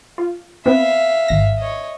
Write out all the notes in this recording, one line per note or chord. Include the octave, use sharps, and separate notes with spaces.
F4
B3 C4 B4 E5 F5
G#1 A#6
C#5 D#5